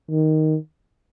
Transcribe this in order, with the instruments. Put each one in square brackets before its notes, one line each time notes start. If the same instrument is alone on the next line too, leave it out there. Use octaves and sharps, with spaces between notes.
[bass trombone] D#3